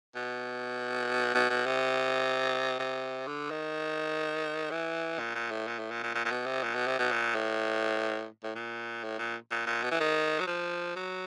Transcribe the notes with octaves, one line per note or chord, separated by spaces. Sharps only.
B2
B2
B2
C3
C3
D3
D#3
E3
A#2
A#2
A2
A#2
A2
A#2
A#2
A#2
A#2
B2
C3
A#2
B2
C3
B2
A#2
A2
A2
A#2
A2
A#2
A#2
A#2
B2
E3
D#3
F#3
F3
F#3